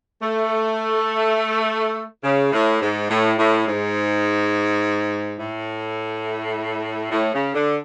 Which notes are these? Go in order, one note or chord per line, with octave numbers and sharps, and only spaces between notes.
A3
C#3
A2
G#2
A2
A2
G#2
A2
A2
C#3
D3